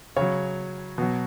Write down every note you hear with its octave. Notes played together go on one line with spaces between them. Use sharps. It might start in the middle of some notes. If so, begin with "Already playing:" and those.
C#3 F#3 C#5
B2 F#3